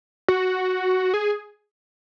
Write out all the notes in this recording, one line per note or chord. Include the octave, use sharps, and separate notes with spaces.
F#4
G#4